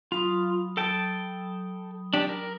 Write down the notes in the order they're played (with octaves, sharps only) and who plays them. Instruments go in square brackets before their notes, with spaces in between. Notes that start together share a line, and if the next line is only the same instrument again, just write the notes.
[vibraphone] F#3 B5 D#6 [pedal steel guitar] F4
[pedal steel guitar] A4 G5 A5
D4 G4
A#4